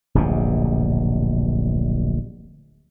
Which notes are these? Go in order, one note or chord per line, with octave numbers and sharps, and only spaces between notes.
D1 A#1 G2 B2